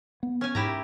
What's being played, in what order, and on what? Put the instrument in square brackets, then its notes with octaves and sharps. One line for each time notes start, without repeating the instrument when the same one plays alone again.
[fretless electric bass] B3
[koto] C#4 G#5
[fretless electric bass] G#2 [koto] E4 G4 A#5